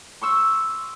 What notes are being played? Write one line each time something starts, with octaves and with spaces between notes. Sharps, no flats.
C6 C#6 E6